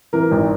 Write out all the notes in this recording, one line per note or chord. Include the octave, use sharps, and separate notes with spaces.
E3 A#4
G#1